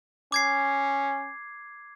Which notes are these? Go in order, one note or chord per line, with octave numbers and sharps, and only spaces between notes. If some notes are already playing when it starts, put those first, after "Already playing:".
C#4 D6 G#6 C7